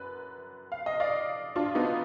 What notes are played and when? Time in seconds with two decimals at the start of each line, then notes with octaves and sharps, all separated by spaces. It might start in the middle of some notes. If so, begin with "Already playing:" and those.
Already playing: F#2 B4
0.72 F5
0.86 D#5
1.00 D5 F5
1.56 D4 F4
1.75 B3 D#4